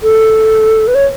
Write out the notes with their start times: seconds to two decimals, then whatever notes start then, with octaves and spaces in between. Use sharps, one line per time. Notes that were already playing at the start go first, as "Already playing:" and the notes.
0.03 A4
0.88 B4
0.95 C#5